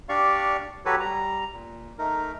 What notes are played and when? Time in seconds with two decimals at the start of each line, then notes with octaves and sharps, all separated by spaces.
0.09 D4 G4 D5 F5 C#6
0.85 F#3 F#4 G4 A4 B4 C#5
1.00 G3 A#5
1.53 A#2
1.99 A3 D#4 A#4